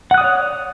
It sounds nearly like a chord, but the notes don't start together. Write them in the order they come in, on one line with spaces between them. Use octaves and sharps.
F#5 F#6 D#6 D5 C#5